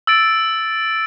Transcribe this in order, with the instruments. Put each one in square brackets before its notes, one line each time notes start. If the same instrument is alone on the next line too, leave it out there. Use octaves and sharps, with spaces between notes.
[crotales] E6 A6 D7